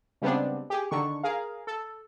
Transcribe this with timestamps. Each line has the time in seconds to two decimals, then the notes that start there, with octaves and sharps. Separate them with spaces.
0.22 C#3 G3 G#3 B3 C4 D4
0.70 G4 G#4
0.91 D3 D#3 C#6
1.23 G#4 A#4 F5
1.67 A4